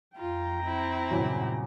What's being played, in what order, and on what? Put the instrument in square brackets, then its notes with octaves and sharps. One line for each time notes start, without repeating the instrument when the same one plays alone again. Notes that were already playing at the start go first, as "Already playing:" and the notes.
[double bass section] F2 [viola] F4 [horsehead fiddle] G5 A#5
[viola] C4 E4
[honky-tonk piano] E2 F#3 [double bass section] G2 A#2 C#3